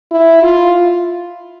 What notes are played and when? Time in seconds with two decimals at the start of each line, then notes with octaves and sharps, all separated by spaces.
0.12 E4
0.43 F4